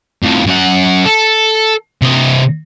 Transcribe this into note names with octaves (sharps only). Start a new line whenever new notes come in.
F2 A2
F#2 F#5
A4
C3 D#5